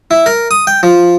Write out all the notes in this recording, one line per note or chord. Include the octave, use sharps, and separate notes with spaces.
E4
A#4
D#6
G5
F3